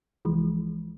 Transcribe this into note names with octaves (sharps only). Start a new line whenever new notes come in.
C2 E3 F3 G#3